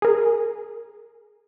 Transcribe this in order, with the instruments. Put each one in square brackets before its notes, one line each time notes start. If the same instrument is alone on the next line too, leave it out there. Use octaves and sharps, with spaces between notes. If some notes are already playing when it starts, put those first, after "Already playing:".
[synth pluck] G#4 A#4